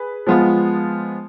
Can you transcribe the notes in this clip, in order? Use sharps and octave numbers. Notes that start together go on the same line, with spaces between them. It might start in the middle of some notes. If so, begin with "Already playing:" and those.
Already playing: G#4 B4
F3 G#3 B3 F4